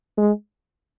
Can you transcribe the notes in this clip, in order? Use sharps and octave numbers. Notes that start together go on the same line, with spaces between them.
G#3